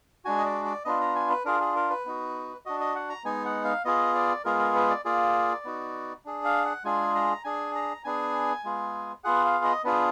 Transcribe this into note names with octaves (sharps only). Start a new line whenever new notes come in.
G#3 D4 F#4 G#5
D#5
D5
D5
B3 D4 F4 D#5
A#5
G#5
B4
D4 F4 G#4 A#4
G#4
A#4
B4
B3 D#4 F#4
D4 F#4 D#5
D#5
F#5
A#5
G#3 B3 D#4 G#5
F#5
F5
B3 F4 G#4 D#5
D5
G#3 B3 F4 G#4 A#4
A#4
B4
D5
A#3 F4 G#4 D5
B3 D#4 F#4
D4 G#4
F5
F#5
G#3 D4 F4 G#4 G#5
A#5
D4 G#4 G#5
A#5
B3 D4 G#4 G#5
G#3 B3 F4 G#4
B3 F4 G#4 F#5
F5
D#5
B3 D4 F4 G#4 B4